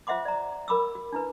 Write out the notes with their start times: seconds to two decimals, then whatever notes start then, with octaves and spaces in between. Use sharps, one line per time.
0.07 F4 C5 E5 F#5 C6 D6
0.25 D5 A#5
0.68 A#4 B5 D6 E6
0.95 F#4
1.12 D4 E4 B4